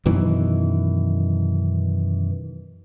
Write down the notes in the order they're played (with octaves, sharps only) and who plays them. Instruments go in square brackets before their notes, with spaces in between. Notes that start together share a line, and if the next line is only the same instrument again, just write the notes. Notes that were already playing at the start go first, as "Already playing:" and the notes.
[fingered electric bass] F#2 B2 D#3 E3